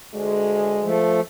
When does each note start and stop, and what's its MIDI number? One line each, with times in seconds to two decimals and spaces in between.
0.14 0.94 38
0.14 0.94 56
0.83 1.21 53
0.83 1.21 57